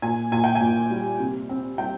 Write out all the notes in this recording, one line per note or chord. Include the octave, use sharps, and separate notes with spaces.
A#2 G#5
A#2 G#5
G5
G#5
A#2
G3
C3
C4
G3 G5